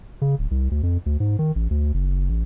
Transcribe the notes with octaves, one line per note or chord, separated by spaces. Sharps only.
C#3
D1
C2
D2
F2
D2
G#2
D#3
A1
D2
F#1
A1